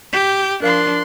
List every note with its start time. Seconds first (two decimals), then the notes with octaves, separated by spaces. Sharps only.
0.13 G4 G6 B6
0.62 F3 D4 A#4 F5 C6 F#6 C7